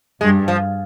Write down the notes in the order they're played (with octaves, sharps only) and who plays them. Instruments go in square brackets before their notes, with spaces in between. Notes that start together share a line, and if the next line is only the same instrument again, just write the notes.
[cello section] G2 [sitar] G#3
[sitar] F3